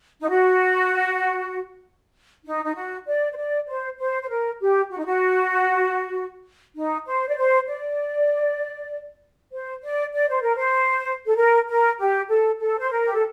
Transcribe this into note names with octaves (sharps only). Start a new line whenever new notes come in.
D#4
F#4
D#4
D#4
F#4
D5
C5
D5
C5
C5
C5
A#4
G4
F#4
D#4
F#4
D#4
C5
D5
C5
D5
C5
D5
D5
C5
A#4
C5
A4
A#4
A#4
G4
A4
A4
C5
A#4
G4
A4